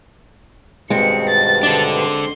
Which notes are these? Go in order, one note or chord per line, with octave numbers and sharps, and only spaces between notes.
G2 B2 D#3 G#3 C4 C#7
A6
D4 A4
C6